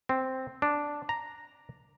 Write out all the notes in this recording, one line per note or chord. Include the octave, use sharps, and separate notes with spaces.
C4
D4
A#5